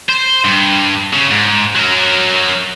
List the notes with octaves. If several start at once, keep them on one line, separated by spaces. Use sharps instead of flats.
C5
G2
C#3
G#2
F#3 A#4